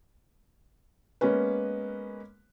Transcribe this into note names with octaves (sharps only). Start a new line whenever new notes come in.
G#3 A#3 B3 C#4 B4